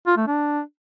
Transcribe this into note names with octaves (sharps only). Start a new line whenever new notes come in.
F4
A3
D4